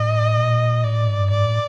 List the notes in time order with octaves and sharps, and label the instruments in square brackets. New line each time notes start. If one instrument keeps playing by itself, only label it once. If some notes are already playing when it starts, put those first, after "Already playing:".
Already playing: [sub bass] A2 [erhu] D#5
[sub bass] A#2
[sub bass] A2 [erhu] D5
[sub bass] G#2
G2
[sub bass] G#2 [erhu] D5
[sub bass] A2